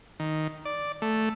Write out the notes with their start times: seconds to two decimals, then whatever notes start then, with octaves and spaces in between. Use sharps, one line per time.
0.20 D#3
0.65 D5
1.02 A3